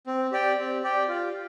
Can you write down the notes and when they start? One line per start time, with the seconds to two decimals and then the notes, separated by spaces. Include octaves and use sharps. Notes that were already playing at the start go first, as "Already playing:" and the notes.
0.07 C4
0.32 G4 D5 G5
0.58 C4
0.83 G4 D5 G5
1.08 F4